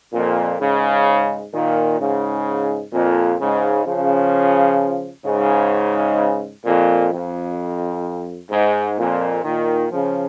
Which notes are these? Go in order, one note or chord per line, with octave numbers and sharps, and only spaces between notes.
F2 A#2
G#2 C#3
A#2 D#3
G#2 C#3
F2 A#2
G#2 C#3
C#3 F3
G#2 C#3
F2 A#2
F2
G#2
F2 A#2
A#2 D#3
C#3 F3